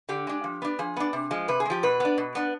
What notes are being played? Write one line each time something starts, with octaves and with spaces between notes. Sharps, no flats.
D3 G4
G#3 D4
F3
B3 D4
F3 G#4
B3 D4
C3
F3 G#3
C3 B4
G#4
G#3
F3 G4
B2 B4
B3 D4
B2
B3 D4